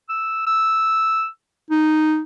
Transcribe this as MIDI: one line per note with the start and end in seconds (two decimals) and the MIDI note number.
0.09 0.43 88
0.47 1.27 88
1.71 2.21 63